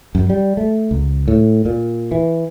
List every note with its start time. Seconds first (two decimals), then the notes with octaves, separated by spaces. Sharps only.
0.15 F#2
0.30 G3
0.57 A3
0.91 C#2
1.28 A2
1.65 A#2
2.11 E3